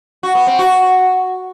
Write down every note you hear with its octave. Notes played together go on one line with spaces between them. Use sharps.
F#4
B3
C4
F#4